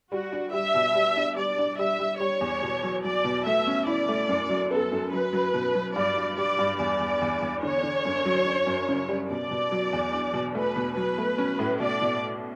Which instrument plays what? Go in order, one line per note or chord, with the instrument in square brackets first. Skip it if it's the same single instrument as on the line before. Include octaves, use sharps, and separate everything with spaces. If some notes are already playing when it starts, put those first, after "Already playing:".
[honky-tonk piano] G3 [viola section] F#4
[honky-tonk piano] D4
[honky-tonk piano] G3 [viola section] E5
[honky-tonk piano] B2
G3
D4
[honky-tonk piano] G3 [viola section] D5
[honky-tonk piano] D4
[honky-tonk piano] G3 [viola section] E5
[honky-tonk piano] G3
[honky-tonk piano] G3 [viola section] C#5
[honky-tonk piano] E2
B2
F#3
[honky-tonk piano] F#3 [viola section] D5
[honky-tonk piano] B2
[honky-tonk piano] A3 [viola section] E5
[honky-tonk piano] C#4
[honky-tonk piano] E4 [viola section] D5
[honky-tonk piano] A3
F#2
F#3
[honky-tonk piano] B3 [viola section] A4
[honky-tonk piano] F#2
[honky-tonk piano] F#3 [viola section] B4
[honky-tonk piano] F#3
B2
F#3
[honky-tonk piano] G2 [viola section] D5
[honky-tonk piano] D4
[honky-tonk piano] G3 [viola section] D5
[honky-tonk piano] G2
[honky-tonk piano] E2 [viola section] D5
[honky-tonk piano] E2
E2
E2
[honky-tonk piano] D3 [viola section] C#5
[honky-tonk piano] D3
F#2
F#3
D4
F#2
C#3
G3
[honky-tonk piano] B2 [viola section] D5
[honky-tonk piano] B2
F#3
E2
D4
B2
[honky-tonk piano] A3 [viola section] B4
[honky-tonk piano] B2
[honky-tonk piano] F#3 [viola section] B4
[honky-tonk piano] A3
C#4
A2
[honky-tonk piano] B2 [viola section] D5
[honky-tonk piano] B2